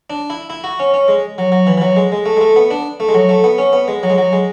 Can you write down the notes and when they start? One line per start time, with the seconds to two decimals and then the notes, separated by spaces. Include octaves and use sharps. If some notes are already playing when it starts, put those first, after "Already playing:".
0.10 D4
0.30 E4
0.50 E4
0.64 F#4
0.80 C#4
0.94 C#4
1.08 G#3
1.38 F#3
1.52 F#3
1.67 E3
1.77 E3
1.81 F#3
1.96 G#3
2.12 G#3
2.26 A3
2.37 G#3
2.41 A3
2.56 B3
2.71 D4
3.00 A3
3.08 G#3
3.14 F#3
3.29 A3
3.44 B3
3.58 C#4
3.73 B3
3.88 G#3
4.03 F#3
4.10 G#3
4.18 F#3
4.33 G#3